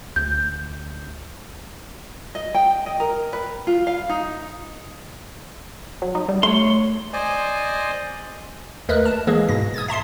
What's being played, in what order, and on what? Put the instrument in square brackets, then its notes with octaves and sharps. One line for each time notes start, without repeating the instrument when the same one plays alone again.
[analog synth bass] D2 [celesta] G6
[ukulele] D#5
G5
D#5
A#4
B4
F4
F5
D#4
[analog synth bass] F#3
D#4
G3
[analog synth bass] A3 [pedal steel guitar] C#5 C6
[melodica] C5 D5 D#5 G#5
[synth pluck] D#2 A3 A#4 B4 D#5 F#6
A5
E3 G#3 A#3 G#4
G#2 B2 A#6
D#6 G#6 A6
E5 A5 C6 C7